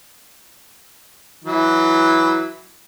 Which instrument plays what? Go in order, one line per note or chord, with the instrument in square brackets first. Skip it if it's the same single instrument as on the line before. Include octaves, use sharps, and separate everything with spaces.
[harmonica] E3 F#3